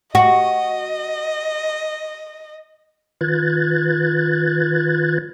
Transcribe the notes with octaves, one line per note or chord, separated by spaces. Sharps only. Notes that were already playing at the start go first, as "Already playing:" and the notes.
F#4 D#5
D#3 F4 B4 F#6 G#6 A6